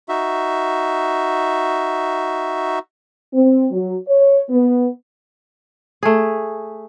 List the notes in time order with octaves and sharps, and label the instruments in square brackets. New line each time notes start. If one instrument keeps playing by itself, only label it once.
[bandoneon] D#4 F#4 E5
[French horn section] C4
F#3
C#5
B3
[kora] A3 G#4